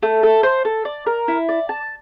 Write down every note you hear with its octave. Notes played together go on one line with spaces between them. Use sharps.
A3
A4
C5
A4
D5
A#4
E4
D5
A5